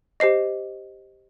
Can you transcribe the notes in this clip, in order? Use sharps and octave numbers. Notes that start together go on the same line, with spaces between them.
G4 C5 D#5 C7